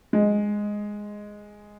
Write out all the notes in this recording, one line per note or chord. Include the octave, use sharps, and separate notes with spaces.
G#3